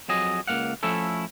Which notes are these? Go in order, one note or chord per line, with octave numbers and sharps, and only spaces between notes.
F2 F#3 G#4 D#5
C#2 F3 A#3 F5 F#5
F3 A3 C#4 E4 A4